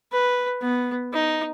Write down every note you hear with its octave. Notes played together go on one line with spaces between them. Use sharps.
B4
B3
D#4